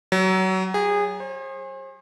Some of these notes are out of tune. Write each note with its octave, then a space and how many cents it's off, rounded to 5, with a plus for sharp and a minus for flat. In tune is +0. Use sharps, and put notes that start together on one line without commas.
F#3 +25
G#4 -25
C5 +40